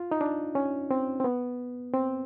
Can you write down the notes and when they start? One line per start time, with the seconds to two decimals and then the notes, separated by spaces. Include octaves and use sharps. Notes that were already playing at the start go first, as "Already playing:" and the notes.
Already playing: F4
0.11 D#4
0.21 D4
0.55 C#4
0.91 C4
1.20 C4
1.24 B3
1.94 C4